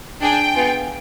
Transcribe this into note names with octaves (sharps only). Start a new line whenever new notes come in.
D4 G#4 G5
B3 F4 G#4